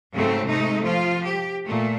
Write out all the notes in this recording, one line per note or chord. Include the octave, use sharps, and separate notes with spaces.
G#2 C#3 F#3 A3 C4
C3 G#3 A3 D#4
F3 F4
G4
A#2 A3